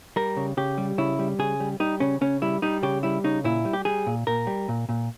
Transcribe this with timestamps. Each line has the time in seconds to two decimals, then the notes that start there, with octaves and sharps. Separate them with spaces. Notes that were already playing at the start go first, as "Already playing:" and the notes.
0.16 G3 A#4
0.37 C#3
0.57 C#3 G4
0.78 G3
0.98 C#3 E4
1.19 G3
1.39 C#3 G#4
1.60 G3
1.80 G3 D#4
2.00 C#3 C#4
2.21 C#3 C#4
2.42 G3 E4
2.62 G3 D#4
2.83 C#3 G4
3.03 G3 E4
3.24 C#3 D#4
3.44 A#2 E4
3.65 G3
3.73 G4
3.85 G3 G#4
4.06 A#2
4.27 A#2 A#4
4.47 G3
4.68 A#2
4.89 A#2